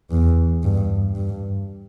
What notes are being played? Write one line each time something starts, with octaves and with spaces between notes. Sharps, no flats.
E2
G2
G2